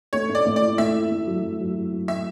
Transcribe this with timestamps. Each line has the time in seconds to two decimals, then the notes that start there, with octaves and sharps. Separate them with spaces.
0.13 A3 C#5
0.29 A2
0.35 D5
0.45 A2
0.56 D5
0.61 E4
0.78 A2 E5
0.94 E4
1.10 A3
1.26 F#3
1.43 F#3
1.60 F#3
1.76 E4
1.92 F#3
2.08 A2 E5